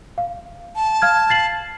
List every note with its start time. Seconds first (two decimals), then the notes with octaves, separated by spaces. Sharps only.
0.18 F5
0.76 A5
1.02 F5 F6 G#6
1.30 A6 C7 F#7